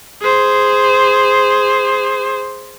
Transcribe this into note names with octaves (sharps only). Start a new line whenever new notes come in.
G#4 C5